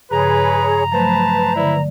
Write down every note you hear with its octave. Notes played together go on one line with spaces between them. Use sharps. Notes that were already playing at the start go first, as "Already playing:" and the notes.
G2 C#3 F3 G#4 B4 C#5 A#5 B5
F3 F#3 A3 B4 C5 A5
D3 E4 D5